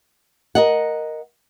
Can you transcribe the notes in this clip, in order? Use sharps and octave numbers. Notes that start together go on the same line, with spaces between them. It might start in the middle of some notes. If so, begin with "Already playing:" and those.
A#4 D#5 F#5